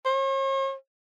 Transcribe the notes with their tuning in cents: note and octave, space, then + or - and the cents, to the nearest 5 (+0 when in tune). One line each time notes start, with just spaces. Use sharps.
C#5 -45